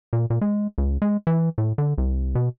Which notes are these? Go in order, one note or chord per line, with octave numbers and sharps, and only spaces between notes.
A#2
A#2
G#3
C#2
G#3
E3
A2
D3
C2
B2